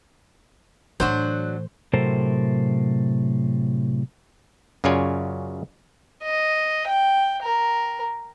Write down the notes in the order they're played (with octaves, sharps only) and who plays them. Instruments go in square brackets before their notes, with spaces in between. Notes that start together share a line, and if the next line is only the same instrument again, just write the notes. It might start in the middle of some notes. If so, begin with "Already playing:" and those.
[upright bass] A2 E3 [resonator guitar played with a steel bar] F#3 D4 F#4 [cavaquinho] C5
[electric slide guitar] A2 C3 F#3 A4 A#4 C5
[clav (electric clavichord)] F#2 C#3 F4 C#5 D5 G#5
[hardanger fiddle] D#5
G5
A#4